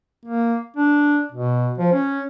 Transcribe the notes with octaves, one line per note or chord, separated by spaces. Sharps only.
A#3
D4
B2
F3
C#4